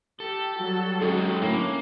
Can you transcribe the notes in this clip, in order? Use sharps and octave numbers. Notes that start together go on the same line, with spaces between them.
G4 A4
F#3 G3 F#4
G#3 C#4 D#4 G4 A4
D3 A3 A#3 C#4 E4